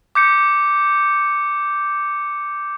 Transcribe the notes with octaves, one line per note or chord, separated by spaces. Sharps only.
D6 G6 C#7